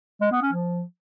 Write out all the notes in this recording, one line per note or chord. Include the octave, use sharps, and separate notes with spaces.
G#3
B3
C#4
F3